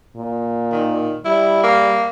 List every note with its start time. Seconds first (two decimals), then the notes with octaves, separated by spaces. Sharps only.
0.17 A#2
0.72 D#3
1.25 G3 E4
1.64 A#3